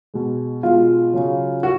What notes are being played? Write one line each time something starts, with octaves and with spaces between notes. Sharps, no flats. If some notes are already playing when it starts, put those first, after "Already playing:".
B2 G#3
B2 G#3 F4
C#3 F#3
F#4